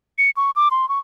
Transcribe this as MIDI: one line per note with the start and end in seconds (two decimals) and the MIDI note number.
0.18 0.30 97
0.37 0.51 85
0.56 0.69 86
0.71 0.88 84
0.89 0.99 85